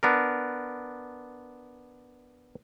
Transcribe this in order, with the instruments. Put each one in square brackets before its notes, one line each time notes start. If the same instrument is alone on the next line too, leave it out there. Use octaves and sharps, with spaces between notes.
[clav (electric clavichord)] B3 D4 A#4